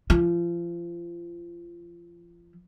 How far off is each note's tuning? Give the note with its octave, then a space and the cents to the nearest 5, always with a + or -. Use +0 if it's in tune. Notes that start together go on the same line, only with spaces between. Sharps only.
F3 -30